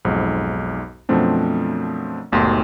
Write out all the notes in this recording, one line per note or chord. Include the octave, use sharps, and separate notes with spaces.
B1 F2 G#2
F#2 B2 F3 A3 C4 D4
G#1 D#2 B2 A3 C6